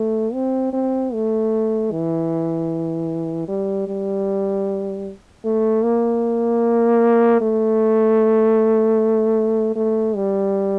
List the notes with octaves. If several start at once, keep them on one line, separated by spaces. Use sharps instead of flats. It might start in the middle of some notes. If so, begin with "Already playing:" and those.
Already playing: A3
C4
C4
A3
E3
G3
G3
A3
A#3
A3
A3
G3